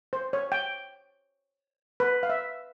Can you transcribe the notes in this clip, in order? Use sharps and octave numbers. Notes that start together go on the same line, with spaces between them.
C5
C#5
G5
B4
F5
E5